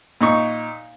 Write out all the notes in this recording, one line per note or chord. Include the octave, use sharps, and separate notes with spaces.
A#2 D#4 C#6